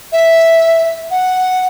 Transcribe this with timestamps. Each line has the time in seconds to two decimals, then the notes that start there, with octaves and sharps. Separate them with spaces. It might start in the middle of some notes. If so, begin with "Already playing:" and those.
0.13 E5
1.11 F#5